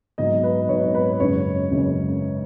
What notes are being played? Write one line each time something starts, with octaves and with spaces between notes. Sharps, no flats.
G#2 F#3 B3 D#4 D#5
B4
G#2 F#3 B3 D#4 C#5
B4
F#1 F#2 C#3 G#3 C#4 C#5
F#1 F#2 C#3 G#3 C#4